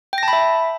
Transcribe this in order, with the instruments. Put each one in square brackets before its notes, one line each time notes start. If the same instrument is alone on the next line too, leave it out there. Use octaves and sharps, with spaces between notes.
[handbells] G5
A#6
A5
B5
E5